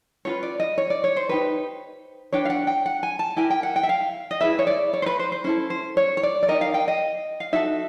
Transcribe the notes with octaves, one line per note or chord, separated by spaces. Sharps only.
C#4 F4 G#4 B4 C#5
D5
D#5
C#5
D5
C#5
C5
D#4 G4 B4
D4 G4 B4 C#5
F5
F#5
G5
F#5
G#5
A5
E4 G4 A#4 G#5
G5
F#5
G5
E5
F5
D#5
E4 G#4 B4 E5
C#5
D5
C#5
C5
B4
C5
C5
C#4 E4 A4 C5
C5
C#5
C#5
D5
D5
D#4 G4 A#4 D#5
F5
G5
D#5
F5
D#4 F#4 A4 E5